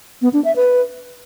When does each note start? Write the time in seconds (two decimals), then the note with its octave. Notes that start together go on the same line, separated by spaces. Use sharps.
0.22 B3
0.33 D4
0.45 E5
0.56 B4